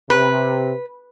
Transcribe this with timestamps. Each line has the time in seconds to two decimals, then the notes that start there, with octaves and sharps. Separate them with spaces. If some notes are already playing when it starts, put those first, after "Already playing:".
0.10 C3 B4